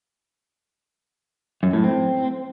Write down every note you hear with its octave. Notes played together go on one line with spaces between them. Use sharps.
F#2
A2
C4